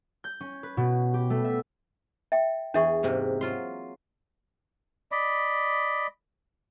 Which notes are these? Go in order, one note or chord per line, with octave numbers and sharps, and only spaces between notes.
G6
C#4
B4
B2
G4
A3
E5
E5 G5
E2 D4 G#4 E5 C#6
G#2 C3 A#3
F#3 F4 C6
D5 D#5 B5